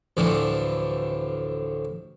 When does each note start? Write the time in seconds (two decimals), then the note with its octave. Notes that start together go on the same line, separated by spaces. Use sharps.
0.17 D2 A2 D3 E3 F3 A3